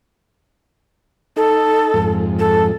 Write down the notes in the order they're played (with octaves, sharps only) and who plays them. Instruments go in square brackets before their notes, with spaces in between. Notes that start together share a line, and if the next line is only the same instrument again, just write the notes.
[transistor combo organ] D#4 [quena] A4
[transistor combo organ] F2 G#2
[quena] A4